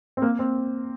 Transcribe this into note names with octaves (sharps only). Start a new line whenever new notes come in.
C4
A#3
C4